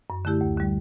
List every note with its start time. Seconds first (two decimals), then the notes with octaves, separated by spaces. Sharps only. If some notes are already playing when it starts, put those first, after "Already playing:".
0.10 F#2
0.25 D3 A3 E4 G4
0.41 D2
0.57 D3 G3